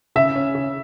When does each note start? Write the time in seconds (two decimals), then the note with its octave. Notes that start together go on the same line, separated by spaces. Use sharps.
0.16 C#3 E5
0.36 C#4
0.55 C#3